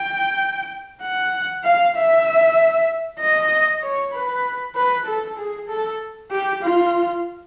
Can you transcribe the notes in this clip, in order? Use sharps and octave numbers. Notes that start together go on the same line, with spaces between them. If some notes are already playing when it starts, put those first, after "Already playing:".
Already playing: G5
F#5
F5
E5
D#5
C#5
B4
B4
A4
G#4
A4
G4
F4